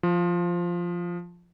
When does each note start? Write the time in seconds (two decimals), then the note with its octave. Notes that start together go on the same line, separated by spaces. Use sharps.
0.03 F3